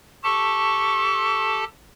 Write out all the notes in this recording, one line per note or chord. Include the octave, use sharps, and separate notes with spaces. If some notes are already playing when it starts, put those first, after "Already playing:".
G4 A4 A5 C#6